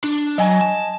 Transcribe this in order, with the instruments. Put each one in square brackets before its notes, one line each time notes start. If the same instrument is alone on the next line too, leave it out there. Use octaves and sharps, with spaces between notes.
[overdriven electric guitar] D4
[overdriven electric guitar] F#3 [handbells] D#5 G#5
[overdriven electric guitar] A5